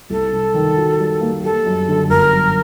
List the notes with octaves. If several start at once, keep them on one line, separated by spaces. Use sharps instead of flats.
C2 A4
C3
D#3
F#4
G3
A#3
G3 A4
F#2
D3
G1 A#4
F#2